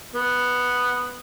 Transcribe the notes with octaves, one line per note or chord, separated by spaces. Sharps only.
B3